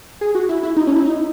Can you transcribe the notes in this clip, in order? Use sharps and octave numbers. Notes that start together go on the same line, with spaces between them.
G#4
F#4
E4
E4
D#4
C#4
E4
D#4